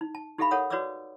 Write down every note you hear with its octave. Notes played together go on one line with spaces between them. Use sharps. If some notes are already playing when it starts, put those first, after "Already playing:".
D#4
A5
D#4 G4 A4 E5 F5 B5
A4 A#4 C#5 F#5 D#6
F#4 B4 C#5 D5 D6 E6